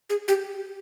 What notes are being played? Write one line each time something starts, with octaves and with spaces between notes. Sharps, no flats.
G#4
G4